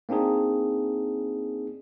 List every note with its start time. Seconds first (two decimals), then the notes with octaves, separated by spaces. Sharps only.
0.09 A#3 C4 D4 D#4 G#4